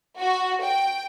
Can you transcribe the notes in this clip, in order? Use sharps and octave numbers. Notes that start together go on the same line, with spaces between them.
F#4
G5